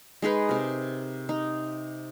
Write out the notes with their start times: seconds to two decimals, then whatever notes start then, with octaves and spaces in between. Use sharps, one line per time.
0.22 G#3 D#4 G#4 B4
0.49 C3 A#4
1.29 D#4